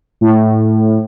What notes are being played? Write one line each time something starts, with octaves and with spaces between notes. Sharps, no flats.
A2